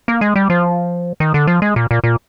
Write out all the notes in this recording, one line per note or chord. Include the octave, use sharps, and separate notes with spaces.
A#3
G#3
G3
F3
D#3
D3
F3
G#3
A#2
A#2
A#2